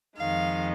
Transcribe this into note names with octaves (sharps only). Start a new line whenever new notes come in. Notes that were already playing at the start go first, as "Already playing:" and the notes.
F2 D#3 G#3 F5